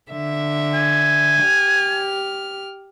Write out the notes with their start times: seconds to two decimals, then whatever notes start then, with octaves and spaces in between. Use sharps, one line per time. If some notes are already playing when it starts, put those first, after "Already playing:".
0.10 D3 E5
0.74 G#5
1.43 G4 F6